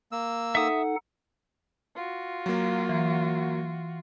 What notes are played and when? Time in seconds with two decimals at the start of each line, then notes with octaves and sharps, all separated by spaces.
0.12 A#3 E6
0.55 D#4 A4 E5 F#5 D#6
1.94 F4 F#4
2.46 F#3 A#3
2.89 E3